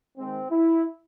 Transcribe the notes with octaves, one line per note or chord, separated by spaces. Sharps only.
D#3 G#3 C4
E4